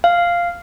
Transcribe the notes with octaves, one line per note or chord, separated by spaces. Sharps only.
F5